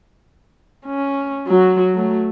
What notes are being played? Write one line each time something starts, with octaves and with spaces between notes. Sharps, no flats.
C#4
F#3 F#4
F#3 A3